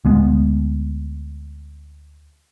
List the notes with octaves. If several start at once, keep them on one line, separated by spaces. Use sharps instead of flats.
D2 G#3 B3